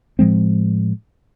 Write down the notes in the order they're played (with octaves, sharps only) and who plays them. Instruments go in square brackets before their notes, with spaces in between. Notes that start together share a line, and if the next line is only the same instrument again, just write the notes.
[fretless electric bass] A2 F3 G#3 C4